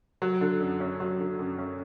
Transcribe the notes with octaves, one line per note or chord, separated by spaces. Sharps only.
F#3
D3
F#2
C#4
F#3
D3
F#2
C#4